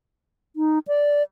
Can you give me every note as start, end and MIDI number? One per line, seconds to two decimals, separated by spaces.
0.56 0.79 63
0.88 1.23 74